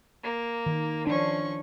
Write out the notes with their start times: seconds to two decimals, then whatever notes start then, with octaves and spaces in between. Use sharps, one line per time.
0.23 A#3
0.66 D#3
1.07 F3 C#4 D4 C#6